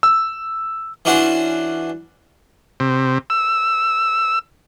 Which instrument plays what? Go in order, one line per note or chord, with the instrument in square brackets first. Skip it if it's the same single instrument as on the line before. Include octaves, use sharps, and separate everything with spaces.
[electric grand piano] E6
[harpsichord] E3 C#4 D4 F#4 F#5 C6
[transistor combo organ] C3
E6